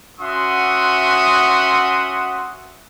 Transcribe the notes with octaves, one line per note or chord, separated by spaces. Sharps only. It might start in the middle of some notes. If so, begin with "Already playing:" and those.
C#4 F#4 E5 F#5 C6 D#6